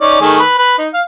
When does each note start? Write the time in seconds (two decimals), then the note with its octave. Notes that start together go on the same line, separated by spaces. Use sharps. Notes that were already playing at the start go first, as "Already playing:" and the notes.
0.01 C#4 D#4 D5
0.21 D#3 A3 G#4
0.40 B4
0.58 B4
0.79 D#4
0.94 F5